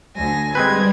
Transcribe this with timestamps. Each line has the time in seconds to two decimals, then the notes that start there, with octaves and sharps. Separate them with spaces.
0.16 D2 G#5 A#6
0.55 G3 G#3 C4 B4 G#6